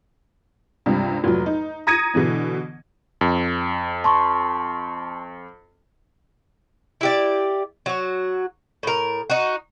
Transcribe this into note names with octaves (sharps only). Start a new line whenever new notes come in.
C#2 G2 C3
F1 A#2 F#3
D#4
A#5 D#6 G#6 A#6 C#7 D#7
B2 D3 E3 B3
F2
A5 C6 C#6
E4 G4 D5
F#3 F#4
A2 A#4
D#4 F#4